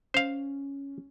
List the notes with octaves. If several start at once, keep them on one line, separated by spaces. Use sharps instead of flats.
C#4 C5 F5